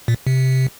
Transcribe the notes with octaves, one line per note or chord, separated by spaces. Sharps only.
A#2
C3